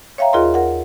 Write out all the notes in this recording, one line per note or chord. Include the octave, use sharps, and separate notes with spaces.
C#5 E5 F5 G5 A#5
D#2 F4 G#4 A#4 D#5 C6
A#4 F#5